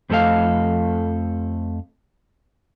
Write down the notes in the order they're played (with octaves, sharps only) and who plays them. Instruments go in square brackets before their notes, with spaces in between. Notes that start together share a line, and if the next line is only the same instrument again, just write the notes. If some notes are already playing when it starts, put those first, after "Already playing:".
[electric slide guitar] F2 F3 A3 A4 D#5 F5